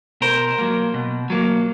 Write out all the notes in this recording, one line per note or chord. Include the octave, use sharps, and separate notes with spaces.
B2 A#4 C5
F#3 A#3
B2
F#3 A#3